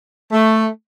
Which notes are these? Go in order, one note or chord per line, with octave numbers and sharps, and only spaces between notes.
A3